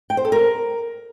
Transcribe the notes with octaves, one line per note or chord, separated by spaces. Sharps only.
G5
C5
A4
A#4